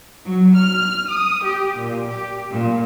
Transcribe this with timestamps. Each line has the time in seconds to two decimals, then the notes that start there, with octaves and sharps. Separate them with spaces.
0.24 F#3
0.56 F6
1.08 D#6
1.43 G4
1.78 A#2
2.09 G4
2.50 A#2